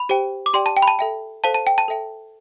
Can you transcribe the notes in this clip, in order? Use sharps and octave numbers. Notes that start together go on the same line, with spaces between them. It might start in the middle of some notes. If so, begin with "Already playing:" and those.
Already playing: B5
G4 C5 G5
D6
G4 D5 G5 C6
A5
G5
B5
A5
A4 E5 G5
A4 C5 F5 A5
A5
G5
A5
A4 E5 G5